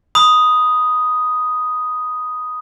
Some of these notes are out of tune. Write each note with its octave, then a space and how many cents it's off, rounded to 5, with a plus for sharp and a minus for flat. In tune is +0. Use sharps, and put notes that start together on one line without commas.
B5 +0 D#6 +0